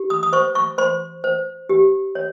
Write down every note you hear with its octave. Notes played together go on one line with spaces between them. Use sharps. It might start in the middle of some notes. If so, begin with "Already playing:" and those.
Already playing: G4
D#6
D#6
C5 C#6
C#6
C5 C6
C5
G4
C#5